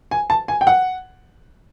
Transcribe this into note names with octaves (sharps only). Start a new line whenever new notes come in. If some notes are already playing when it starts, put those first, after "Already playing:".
G#5
A5
G#5
G5
F#5